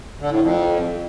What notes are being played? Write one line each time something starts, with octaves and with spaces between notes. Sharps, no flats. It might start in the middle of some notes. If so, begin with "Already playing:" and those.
D3
A2
F2